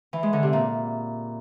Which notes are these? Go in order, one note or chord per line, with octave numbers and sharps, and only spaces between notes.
E3
G#3
D3
C3
A#2